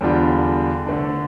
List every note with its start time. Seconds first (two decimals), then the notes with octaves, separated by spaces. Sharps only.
0.01 E2 D3 G3 D4 F4
0.86 D3 A3 D4